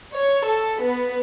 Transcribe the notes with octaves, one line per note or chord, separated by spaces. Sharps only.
C#5
A4
B3